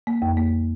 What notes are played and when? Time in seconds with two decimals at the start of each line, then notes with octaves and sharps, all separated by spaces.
0.07 A#3
0.22 F2
0.37 A#3